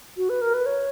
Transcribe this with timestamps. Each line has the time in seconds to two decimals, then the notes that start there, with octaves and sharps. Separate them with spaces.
0.17 F#4
0.30 B4
0.41 A#4
0.54 B4
0.66 C#5